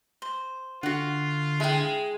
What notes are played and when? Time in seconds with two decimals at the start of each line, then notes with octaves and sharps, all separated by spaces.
0.22 C5
0.83 D3 F4 F#4 F#5
1.60 G#3 E4 G5